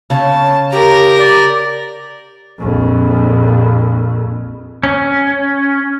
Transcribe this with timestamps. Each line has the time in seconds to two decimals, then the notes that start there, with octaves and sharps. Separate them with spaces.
0.10 C#3 C#4 A5
0.72 G4 A#4 A#5
1.19 D5
2.59 A#1 F2
4.83 C#4